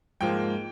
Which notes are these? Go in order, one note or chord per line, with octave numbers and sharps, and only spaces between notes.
G#2 F3 A#3 G5